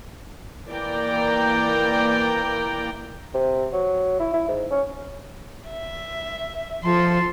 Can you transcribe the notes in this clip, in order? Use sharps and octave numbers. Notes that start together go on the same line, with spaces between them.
E3 A#3 D5 G5 A#5
C3
F#3
E4
E4
G#2
C#4
E5
F3 A4 C6